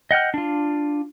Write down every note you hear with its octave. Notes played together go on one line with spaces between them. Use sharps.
D#5 F#5 G5 F6
D4 F4